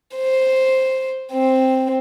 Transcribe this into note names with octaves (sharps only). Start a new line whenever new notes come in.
C5
C4